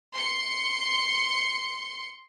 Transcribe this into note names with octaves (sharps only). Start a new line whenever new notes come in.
C6 C#7